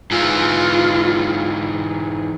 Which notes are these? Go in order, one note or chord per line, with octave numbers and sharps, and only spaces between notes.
G#2 E3 F4